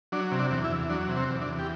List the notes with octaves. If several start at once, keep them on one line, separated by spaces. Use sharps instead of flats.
F#3 D4
C3
D4
E2
E4
E2
F#3 D4
C3
C4
E2
D4
E2
G4